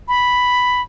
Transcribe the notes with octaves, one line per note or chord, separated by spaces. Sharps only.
B5